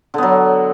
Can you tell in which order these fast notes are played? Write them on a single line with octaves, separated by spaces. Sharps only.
D3 B3 F#3